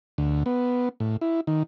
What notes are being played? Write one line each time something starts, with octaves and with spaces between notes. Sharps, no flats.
D2
B3
A2
E4
D#3